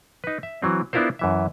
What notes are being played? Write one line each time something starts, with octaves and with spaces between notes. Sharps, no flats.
D#4 B4
E5
E3 F#3 C4
B3 D4 E4 F4 A#4 C5
F#2 E3 E5